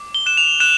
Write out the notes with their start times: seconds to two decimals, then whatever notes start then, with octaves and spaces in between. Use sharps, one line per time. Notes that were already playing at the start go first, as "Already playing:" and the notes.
Already playing: D6
0.15 G7
0.26 F#6 E7
0.37 F7
0.60 F#6 E7